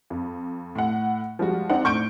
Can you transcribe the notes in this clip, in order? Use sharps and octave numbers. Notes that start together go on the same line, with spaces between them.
F2
A2 F#5
F3 G3 G#3 F#4
C4 D4 D#4 F#5
A2 C#6 G6 D7